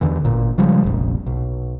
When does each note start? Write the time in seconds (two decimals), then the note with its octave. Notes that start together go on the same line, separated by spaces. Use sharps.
0.01 E2 D3 E3
0.24 G#1 A#2
0.58 C#3 F3 G3 G#3
0.83 F1 A#1
1.27 B1